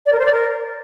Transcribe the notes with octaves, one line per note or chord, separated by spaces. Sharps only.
D5
A#4
C5
D5
A#4